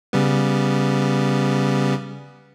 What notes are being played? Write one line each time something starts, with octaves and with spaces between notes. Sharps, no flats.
C#3 G3 B3